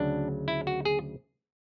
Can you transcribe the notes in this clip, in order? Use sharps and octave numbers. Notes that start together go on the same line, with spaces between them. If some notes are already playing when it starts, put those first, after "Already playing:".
Already playing: D2 C#3 F#3 D4
E4
F#4
G#4